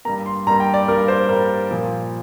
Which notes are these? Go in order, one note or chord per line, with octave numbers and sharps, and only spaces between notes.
G2 G3 A#3 A#5
C6
G2 G3 A#3 A#5
G5
D5
G2 G3 A#3 A#4
C5
G2 G3 A#3 A#4
A#2 F3 A#3